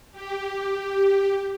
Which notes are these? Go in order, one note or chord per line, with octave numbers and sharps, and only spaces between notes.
G4